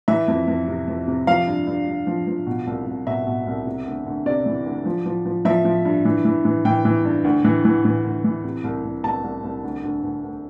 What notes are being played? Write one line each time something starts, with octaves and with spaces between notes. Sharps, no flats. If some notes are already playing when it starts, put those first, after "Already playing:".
E3 E5
F2
F2
C3
F2
C3
F3 F5
G2
G2
G2
F3
F3
B2
C2
C2
B2 E5
B2
C2
C3
D2
D2
C3 D5
E3
D2
F3
F3
F3
F3 E5
F3
G2
E3
E3
E3
E3 G5
E3
G2
D2
E3
E3
E3
D2
E3
C3
C2
C2
C2 A5
C2
C2
D2
D2
D2
D2